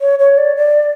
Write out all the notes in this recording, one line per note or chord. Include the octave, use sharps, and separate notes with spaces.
C#5
C#5
D5
D5